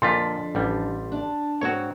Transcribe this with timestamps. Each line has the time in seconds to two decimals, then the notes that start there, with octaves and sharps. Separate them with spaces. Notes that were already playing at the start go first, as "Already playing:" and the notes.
0.02 F2 A#2 D3 F4 C6 A6 B6
0.55 A1 G3
1.12 D4
1.61 G#2 C4 F#4 C#5